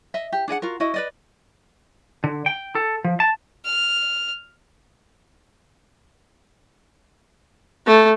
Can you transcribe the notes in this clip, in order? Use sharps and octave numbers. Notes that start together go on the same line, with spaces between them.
D#5 E5
G4
D4 G#4 D#5 F#5
F4 F#4 A#4
E4 F#4 D#5
B4 D5 D#5
D3
G5
A4
F3
A5
F6
A3